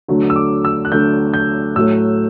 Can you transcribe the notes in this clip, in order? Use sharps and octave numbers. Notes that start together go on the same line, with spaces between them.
D2 D3 F#3 A3
E6
D6
E6
F#6
D2 D3 F#3 A3 G6
G6
A2 F#3 A3 E6